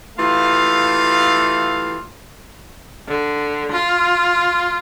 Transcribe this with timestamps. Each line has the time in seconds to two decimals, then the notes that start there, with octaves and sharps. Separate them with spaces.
0.18 E3 A3 F4 G4 F5
3.08 D3
3.72 F4